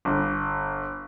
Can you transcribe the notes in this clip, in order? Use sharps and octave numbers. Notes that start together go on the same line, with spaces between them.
G1